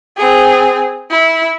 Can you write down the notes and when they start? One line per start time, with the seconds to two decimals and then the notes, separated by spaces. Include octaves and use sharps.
0.17 C4 G#4
1.11 E4